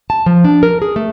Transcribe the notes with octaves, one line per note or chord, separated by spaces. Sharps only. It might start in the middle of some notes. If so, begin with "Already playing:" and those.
A5
F3
D4
A#4
G#4
A3